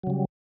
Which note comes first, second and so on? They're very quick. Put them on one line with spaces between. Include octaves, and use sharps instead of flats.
F#3 C#3 G3